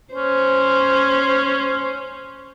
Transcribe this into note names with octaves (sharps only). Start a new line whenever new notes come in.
C#4 C5